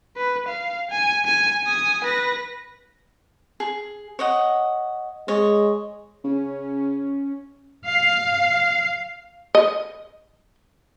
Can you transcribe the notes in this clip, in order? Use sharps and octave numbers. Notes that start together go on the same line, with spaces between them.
B4
F5
G#5
G#5
G#5 D#6
B4 A#6
G#4
C#5 D#5 F#5
G#3 C#5 D#5
C#3 C#4
F5
D#5